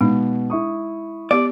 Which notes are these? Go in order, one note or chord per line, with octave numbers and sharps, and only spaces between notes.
B2 G#3 D#4
E4 C#6 D#6
B3 G4 D5